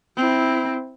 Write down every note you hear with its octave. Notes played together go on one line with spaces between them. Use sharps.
C4 E4